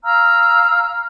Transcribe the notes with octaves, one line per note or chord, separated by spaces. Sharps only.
F5 A#5 E6 F6